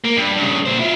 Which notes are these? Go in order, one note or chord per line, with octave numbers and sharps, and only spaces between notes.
A#3
G2
G2 C#3
A#2 C5
E4 F4